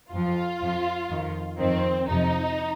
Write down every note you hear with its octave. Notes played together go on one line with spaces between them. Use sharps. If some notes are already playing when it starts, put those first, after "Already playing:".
F2 F3 F4
F2 F3
F2 D#3
F2 D#3 C4
F2 C3 F3 D#4